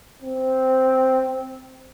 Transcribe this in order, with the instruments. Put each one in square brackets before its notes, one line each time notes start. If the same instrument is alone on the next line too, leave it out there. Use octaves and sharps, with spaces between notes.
[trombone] C4